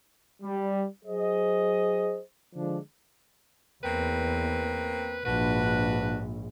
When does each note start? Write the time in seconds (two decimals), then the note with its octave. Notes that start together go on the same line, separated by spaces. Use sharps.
0.43 G3
1.05 F#3 G#4 C5 D#5
2.55 D3 F3 G#3 D4
3.84 E2 A#3 C4 B4
5.26 A#1 G#2 D4 F#4 B4